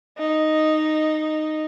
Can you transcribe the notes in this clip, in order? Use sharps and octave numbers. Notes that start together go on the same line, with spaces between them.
D#4